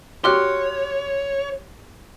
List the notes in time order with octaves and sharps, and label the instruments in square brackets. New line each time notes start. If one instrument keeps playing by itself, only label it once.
[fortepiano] F#4 G4 [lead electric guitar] C#5 [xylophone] C6 F6 F#6